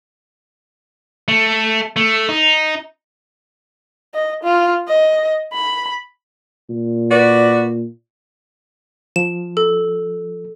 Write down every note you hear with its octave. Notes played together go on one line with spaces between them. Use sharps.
A3
A3
D#4
D#5
F4
D#5
B5
A#2
F#4 B4 D5
F3 E7
A4